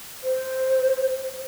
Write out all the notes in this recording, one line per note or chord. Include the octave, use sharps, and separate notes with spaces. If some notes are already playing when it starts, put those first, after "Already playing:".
C5